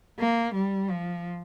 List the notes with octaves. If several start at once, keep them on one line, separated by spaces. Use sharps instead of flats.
A#3
G3
F3